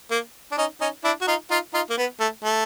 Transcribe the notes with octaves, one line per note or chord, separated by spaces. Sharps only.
A#3
D4
C#4 D#4
C#4 D#4
D4 E4
F#4
D#4 F4
D#4 F4
D#4 F4
A#3
B3
A3
A3